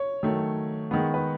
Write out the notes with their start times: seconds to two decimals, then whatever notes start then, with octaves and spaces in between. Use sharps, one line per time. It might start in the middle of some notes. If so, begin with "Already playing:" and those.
Already playing: C#5
0.23 D#3 F#3 A3
0.91 D#3 G#3 B3
1.14 B4